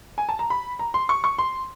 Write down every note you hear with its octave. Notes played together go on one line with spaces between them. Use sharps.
G#5
A5
A#5
B5
A#5
C6
C#6
C#6
C6